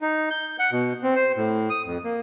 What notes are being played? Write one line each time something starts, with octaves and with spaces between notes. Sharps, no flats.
D#4
G6
F#5
B2
C4
C5
A2
D#6
F2
A#3